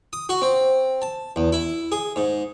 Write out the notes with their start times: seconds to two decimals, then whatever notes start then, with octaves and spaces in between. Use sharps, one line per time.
0.13 D#6
0.29 F#4
0.42 C4
1.02 A5
1.36 E2
1.52 E4
1.92 G#4
2.16 G#2